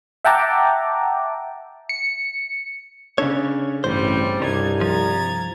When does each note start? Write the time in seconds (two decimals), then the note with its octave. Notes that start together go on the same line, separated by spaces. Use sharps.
0.25 E5 F#5 G5 A5 A#5 D6
1.89 C#7
3.18 C#3 C#4 D4 A4 C#5
3.84 A1 G2 G3 C4 C5
4.41 C2 G2 D#4 G#6
4.81 F3 A#5 G#6 A6